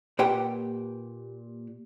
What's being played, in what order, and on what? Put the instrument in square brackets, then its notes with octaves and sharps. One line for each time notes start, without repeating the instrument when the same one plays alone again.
[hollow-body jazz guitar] A#2 G4 B4 F#5 G5